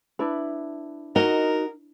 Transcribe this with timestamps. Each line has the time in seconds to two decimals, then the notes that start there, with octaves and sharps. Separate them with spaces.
0.19 D4 E4 B4
1.16 D#4 F#4 A#4 D#5